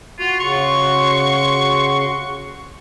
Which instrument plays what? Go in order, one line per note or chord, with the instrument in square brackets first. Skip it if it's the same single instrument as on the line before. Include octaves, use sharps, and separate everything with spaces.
[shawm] F4 [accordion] F#4 C6
[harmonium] C#3 [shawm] C#6